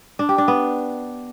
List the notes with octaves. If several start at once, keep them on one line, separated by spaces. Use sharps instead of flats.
D4
G4
D4
B3